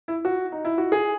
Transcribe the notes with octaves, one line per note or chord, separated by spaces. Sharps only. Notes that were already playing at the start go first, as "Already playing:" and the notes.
E4
F#4
D#4
E4
F#4
G#4